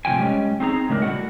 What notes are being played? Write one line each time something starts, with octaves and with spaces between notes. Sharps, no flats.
A2 C3 F3 G5 G#5
G3 G#3 C#4
C4 D#4 G#4 A#5
A2 C#3 G#3 D4 A#4
A2 G3 C4 F#4 F#5